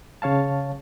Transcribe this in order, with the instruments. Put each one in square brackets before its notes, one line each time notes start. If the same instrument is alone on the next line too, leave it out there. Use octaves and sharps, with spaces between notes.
[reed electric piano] C#3 C#5 F5 A5